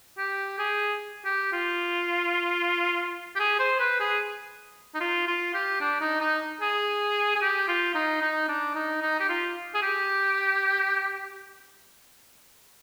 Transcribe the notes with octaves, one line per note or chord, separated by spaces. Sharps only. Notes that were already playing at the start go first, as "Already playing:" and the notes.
G4
G#4
G4
F4
G4
G#4
C5
B4
G#4
D#4
F4
F4
G4
D4
D#4
D#4
G#4
G#4
G4
F4
D#4
D#4
D4
D#4
D#4
G4
F4
G#4
G4